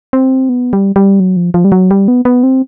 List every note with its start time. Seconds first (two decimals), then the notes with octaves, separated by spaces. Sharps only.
0.13 C4
0.49 B3
0.73 G3
0.96 G3
1.20 F#3
1.37 F3
1.54 F3
1.64 G3
1.72 F#3
1.91 G3
2.08 B3
2.25 B3
2.43 C4